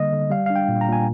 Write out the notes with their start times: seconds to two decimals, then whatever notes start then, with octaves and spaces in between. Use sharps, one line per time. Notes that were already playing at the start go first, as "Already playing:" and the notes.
Already playing: D3 G3 A#3 D#5
0.12 D3
0.30 G3 F5
0.46 D4 F5
0.56 G5
0.68 A#2
0.81 A#5
0.88 A#2 G#5